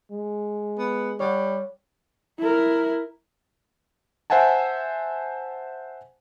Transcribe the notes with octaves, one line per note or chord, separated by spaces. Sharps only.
G#3
B3
G3 C#5 F#5
E4 A#4
C5 E5 F#5 G#5 A5